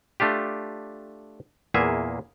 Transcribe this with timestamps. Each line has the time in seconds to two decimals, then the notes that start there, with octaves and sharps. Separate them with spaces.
0.20 A3 D4 F4 G4
1.74 E2 A#2 A#3 G#4 E5